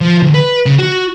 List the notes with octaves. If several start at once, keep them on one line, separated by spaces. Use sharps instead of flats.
F3
D2
B4
C#3
F#4